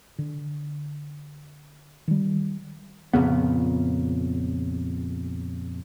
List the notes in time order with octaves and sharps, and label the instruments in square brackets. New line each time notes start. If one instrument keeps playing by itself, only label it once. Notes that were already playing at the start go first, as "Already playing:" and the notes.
[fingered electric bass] D3
D#3 G3
[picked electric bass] A#1 F2 C#3 B3